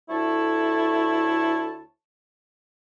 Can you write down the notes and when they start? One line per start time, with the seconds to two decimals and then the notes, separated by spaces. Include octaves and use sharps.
0.10 D2 A3 E4 C#5 A5 C#6